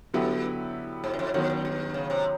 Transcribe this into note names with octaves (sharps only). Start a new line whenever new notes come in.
G2 D3 F#3 B3 E4 G4
G#2
F#2
F2
F2 D#3 F#3 B3
F#2
G2
C#3
C3